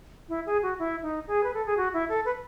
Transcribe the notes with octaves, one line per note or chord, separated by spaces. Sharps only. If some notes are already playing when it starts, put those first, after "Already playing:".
E4
G#4
F#4
E4
D#4
G#4
B4
A4
G#4
F#4
E4
A4
B4